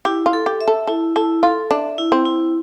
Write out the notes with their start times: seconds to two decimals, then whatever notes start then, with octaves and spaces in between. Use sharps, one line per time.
0.05 E4 G4
0.26 F4
0.33 A4
0.46 G4
0.61 E5
0.68 A4
0.87 E4 A4
1.16 E4 A4
1.43 F4 A4
1.71 D4 E5
1.98 E4
2.12 C4
2.26 E4